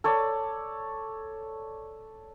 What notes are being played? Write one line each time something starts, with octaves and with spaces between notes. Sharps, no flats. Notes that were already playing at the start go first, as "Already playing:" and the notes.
A4 C#5 D5